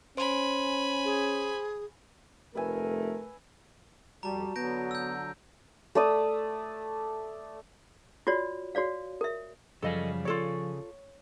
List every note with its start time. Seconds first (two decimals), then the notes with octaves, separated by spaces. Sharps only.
0.17 C#4 C5 G#5 B5 C6
1.05 G#4
2.55 F1 A3 A#4 B4 E5 G#5
4.23 F2 G3 F#4 A5 A#5
4.56 D3 F#3 B3 G6 A#6 D7
4.91 E6 G6
5.95 A3 D5 D#6
8.27 F4 F#4 C#5 D5
8.75 F#4 C#5 D5 F5
9.21 A#4 E5
9.82 F#2 C#3 F3 G3 G#4 A4 D#5 F5
10.25 F4 A4 C#5 D5